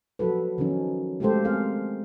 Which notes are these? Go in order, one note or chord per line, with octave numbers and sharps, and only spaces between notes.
F3 F#3 F#4 A4 B4
D#3 F3 F#3 C#4 D#4
G#3 A3 F4 G4 A4 C5
C4 G#4 A#4 F5